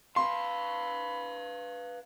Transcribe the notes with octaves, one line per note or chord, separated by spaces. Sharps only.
B4 F5 B5 C6